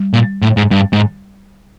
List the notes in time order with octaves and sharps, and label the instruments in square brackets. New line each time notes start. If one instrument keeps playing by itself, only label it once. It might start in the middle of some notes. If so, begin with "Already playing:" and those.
Already playing: [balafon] G3
[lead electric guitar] A#2
A2
G#2
G2
G#2